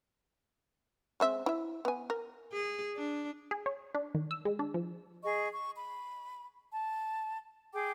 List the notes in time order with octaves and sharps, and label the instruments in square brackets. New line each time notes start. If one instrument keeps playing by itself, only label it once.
[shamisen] G#3 C4 E5
E4 E5
B3 G#5
A#4
[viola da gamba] G#4
D4
[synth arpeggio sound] G#4
C#5
D4
D#3
E6
G#3
D4
F3
[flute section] G#4 D#5 C#6
C#6
B5
A5
G#4 G5 D6